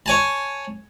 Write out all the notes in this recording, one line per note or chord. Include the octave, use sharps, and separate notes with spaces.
C#5 G#5 A5